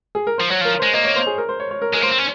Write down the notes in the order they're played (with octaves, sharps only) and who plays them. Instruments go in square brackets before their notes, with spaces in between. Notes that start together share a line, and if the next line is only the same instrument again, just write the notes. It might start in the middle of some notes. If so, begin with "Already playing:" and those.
[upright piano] G#4
A#4
[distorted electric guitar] F3 [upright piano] C5
[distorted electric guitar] F#3 [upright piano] C#5
[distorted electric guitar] F3 [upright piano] A#4
[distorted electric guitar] G#3 [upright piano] C5
[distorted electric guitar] A#3 [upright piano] D#5
[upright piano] C#5
C5
G#4
A#4
C5
C#5
C#5
A#4
[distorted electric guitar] G#3 [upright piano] A#4
[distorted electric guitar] A#3 [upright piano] C5
[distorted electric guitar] C4
C#4